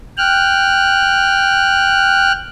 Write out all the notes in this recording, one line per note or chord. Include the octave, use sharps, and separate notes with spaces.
G5 F6 F#6